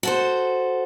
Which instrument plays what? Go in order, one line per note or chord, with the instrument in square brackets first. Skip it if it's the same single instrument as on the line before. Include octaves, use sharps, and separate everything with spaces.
[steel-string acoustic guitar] F#4 A4 C5